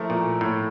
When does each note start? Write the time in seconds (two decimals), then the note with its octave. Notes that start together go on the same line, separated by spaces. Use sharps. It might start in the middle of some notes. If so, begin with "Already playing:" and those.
Already playing: F3 A3 E4 A#4
0.10 A#2
0.41 A2